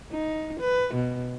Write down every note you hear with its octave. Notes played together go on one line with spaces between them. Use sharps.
D#4
B4
B2